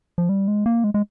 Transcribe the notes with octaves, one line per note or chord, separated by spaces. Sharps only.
F3
G3
G#3
A#3
G#3
G#3